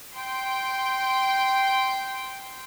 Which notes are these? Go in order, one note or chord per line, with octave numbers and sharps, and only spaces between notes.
G5 C6